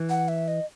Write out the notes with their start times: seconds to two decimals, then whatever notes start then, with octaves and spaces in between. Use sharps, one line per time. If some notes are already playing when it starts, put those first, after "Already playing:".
Already playing: E3
0.09 F#5
0.28 E5
0.48 D#5